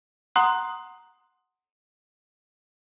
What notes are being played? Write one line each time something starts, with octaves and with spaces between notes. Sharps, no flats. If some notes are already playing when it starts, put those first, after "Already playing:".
F#5 A#5 C6 D#6 F#6